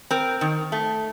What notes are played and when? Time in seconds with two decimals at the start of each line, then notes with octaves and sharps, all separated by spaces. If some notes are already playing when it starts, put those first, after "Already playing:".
0.11 C4 A#4
0.41 D#3
0.72 A3